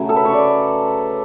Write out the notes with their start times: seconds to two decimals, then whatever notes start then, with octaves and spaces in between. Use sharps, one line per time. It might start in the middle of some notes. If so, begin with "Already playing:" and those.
Already playing: C#3 F#3 A3
0.09 A4
0.16 B4
0.25 C#5
0.33 D5